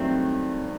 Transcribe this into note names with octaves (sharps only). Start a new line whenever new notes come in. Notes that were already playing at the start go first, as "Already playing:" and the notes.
Already playing: G2 D#3 F#3 A3 C4